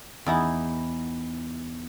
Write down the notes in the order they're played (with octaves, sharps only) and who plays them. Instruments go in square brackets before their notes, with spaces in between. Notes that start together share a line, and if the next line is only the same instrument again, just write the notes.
[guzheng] E2 D#4 E4